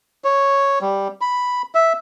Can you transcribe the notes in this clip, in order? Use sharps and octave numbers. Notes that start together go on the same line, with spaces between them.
C#5
G3
B5
E5